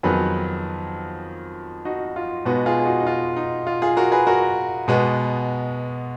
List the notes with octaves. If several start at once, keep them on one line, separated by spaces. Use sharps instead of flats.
F2 D#3 F#3 B3 G#4 B4
D#4 F#4
F4
B2 G#3 B3 D#4 F#4
F4 G#4
G#4
D#4 F#4
D#4
F4
D#4
F4
F4 G#4
F#4 A#4
G#4 B4
F#4 A#4
B2 G#3 B3